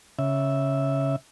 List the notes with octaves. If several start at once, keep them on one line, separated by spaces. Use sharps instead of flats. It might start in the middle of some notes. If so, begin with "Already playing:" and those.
C#3 E5